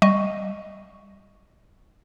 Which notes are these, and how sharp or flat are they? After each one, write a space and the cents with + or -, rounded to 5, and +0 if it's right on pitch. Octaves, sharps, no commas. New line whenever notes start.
G3 +0 D#5 +0 C#6 +0